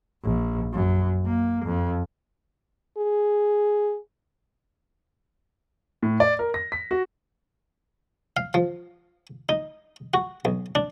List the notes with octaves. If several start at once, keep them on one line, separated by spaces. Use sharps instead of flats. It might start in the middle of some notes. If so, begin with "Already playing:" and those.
A#1
F#2
A#3
F2
G#4
A2
D5
A#4
A#6
B6
F#4
F5
F3
D#4
F#4
B1
D4